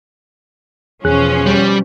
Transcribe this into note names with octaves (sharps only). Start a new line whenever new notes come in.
E2 B2 F3 C#4 G#4 F#6
G3